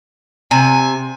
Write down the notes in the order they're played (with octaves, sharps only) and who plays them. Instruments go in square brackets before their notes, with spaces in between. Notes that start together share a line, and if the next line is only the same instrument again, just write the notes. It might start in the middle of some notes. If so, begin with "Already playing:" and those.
[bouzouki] C3 [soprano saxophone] G#5